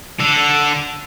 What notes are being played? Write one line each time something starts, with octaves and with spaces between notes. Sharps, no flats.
D3 A4